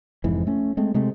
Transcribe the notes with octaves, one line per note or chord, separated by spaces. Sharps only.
F1 F2 G#2 E3
A3 C#4
G#3 A3 C4
C3 G#3 A3 C4